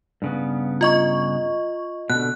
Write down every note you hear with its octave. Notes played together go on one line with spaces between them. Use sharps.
G2 C#3 B3
F4 D#5 C#6
B2 D3 F#6